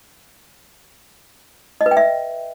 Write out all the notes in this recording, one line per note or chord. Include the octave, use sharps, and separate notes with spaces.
D#5
B4
G5
E5